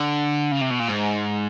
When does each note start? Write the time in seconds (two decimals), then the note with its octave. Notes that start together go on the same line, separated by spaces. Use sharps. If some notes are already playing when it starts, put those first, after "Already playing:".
Already playing: D3
0.52 C#3
0.61 C3
0.70 B2
0.80 A#2
0.88 G#2